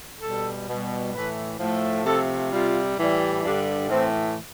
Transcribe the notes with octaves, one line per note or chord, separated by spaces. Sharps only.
B2 G3 A4
B2 G3
A2 E3 A3 B4
A2 F3 A3
C3 F3 A3 A4
C3 G3 F4
A2 E3 G3
G2 D3 G3 D4
A2 E3 A3 C4